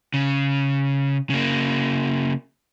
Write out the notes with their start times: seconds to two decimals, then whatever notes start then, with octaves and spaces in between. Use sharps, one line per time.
0.14 C#3
1.30 C#3 A#3